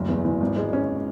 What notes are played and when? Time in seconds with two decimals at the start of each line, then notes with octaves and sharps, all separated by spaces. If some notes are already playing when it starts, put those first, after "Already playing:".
Already playing: F#1 D2
0.08 E2
0.25 E2
0.41 G#1
0.56 G#3
0.73 C#4